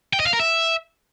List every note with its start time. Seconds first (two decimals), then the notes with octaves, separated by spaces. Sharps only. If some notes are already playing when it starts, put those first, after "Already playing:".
0.13 G5
0.20 D#5
0.26 F5
0.33 A#4
0.40 E5